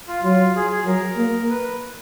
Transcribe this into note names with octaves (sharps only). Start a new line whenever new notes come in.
F4
F#3 F4
G#4
G#4
F#3 A#4
A#3
B4